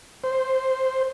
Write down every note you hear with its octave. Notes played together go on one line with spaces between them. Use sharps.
C5